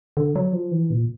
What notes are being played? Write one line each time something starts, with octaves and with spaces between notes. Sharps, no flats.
D3
F#3
F3
E3
A#2